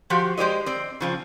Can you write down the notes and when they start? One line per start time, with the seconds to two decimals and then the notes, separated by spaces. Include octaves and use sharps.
0.10 F3 F#4 G4 C5
0.38 G#3 G4 C5 D5 D#5
0.66 C4 D5
1.01 C#3 F3 C4